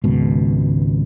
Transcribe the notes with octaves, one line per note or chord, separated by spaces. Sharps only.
G#1 C#2 B2